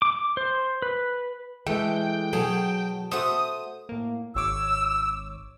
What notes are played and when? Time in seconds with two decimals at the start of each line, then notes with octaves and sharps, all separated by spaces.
0.02 D6
0.37 C5
0.82 B4
1.67 E3 G#3 A3 G5
2.33 B2 F#3 G#4 A4
3.12 A3 F#4 C5 D#6
3.89 A2 A#3
4.35 G#1 C#5 D6 E6